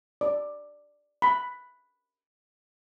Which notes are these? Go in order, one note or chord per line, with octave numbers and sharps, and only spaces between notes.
D5
B5